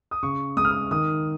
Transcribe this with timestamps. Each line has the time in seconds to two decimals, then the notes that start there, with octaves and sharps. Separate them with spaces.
0.11 D#6
0.23 C#3 C#6
0.56 G#3 D#6
0.65 F6
0.71 D#6
0.91 D#3 D#6